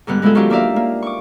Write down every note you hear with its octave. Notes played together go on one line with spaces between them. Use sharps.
G#2 D3 G3 B3 F#6
G#3 B3 E4 F4 G#4 A4
D#3 F#3 C#4 E4 F4 G4
A#3 D4 D#4 D5 E5 F5
A#3
C#6 D6